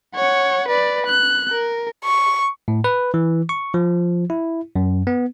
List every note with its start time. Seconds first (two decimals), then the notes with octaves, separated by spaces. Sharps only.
0.16 C#5 F#5
0.68 B4 D5
1.06 F#6
1.52 A#4
2.05 C#6
2.68 A2
2.84 B4
3.14 E3
3.49 C#6
3.74 F3
4.30 E4
4.76 F#2
5.07 B3